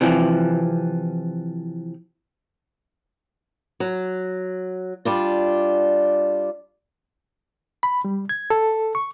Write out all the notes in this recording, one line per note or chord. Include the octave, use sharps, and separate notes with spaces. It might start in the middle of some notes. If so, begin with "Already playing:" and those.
C3 E3 F3
F#3
G3 D4 F4
B5
G3
G#6
A4
C#6